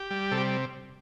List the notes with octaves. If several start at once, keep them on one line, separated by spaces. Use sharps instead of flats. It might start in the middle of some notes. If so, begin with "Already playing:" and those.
Already playing: G4
G3
C3 A4
G4